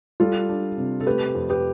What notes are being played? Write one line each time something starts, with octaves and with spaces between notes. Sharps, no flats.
G3 F4 A4
D4
C3
A4
A3 G4 B4
F2
G4 B4